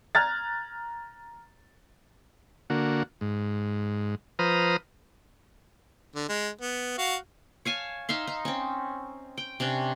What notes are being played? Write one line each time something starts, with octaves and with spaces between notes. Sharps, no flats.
A#5 F6 F#6 G#6 A6
D3 A#3 F#4
G#2
F3 B4 C5 A#5 D#6 F6
D3
G#3
B3
F#4 F5
C#5 F5 G#5 A5
D#4 E5 F5 C6
D#4
C4 C#4
G5
C3 C#4 D4 G5